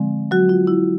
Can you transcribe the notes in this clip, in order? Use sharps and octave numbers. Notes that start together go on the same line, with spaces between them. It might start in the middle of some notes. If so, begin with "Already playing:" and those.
Already playing: D3 F3 G#3 C4
F#3 F#4
F4
E4